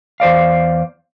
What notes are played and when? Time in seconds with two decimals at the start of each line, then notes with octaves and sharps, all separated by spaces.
0.20 E2 C5 D5 F5